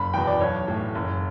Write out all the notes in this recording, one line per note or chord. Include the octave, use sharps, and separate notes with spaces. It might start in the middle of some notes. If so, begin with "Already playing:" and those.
Already playing: F#1 B5
E2 B2 G5
D5
B1 C#5
A2 E3
F#1